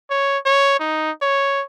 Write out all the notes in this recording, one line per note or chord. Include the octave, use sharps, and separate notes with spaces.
C#5
C#5
D#4
C#5